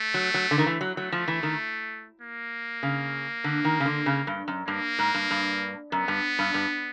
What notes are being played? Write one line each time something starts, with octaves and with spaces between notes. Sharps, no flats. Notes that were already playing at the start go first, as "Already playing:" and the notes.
Already playing: A3
F#3
F#3
D3
D#3
E3
F#3
F#3 A3
F3
E3
D#3
A#3
C#3
D3
D#3
C#3
D3
C#3
G2
F#2
G2 A#3
G#2
G2
G2
F#2 B3
G2
G2
G2